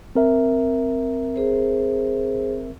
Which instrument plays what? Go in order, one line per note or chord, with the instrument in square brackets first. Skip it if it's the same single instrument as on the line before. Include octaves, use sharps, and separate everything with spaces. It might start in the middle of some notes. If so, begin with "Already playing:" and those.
[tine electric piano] C4 A#4 E5
[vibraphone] G#4 C5